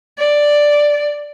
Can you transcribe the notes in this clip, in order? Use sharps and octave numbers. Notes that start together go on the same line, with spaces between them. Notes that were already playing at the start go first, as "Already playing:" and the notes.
D5